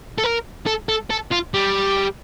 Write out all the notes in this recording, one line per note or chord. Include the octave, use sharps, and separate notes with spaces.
A4
A#4
A4
A4
A4
F4
G3